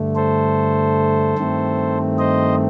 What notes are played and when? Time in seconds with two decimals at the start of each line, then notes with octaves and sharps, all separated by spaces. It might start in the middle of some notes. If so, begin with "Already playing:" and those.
Already playing: G2 D3 A3
0.16 A4 C5
1.38 G2 D#3 A3 C4
2.19 C5 D#5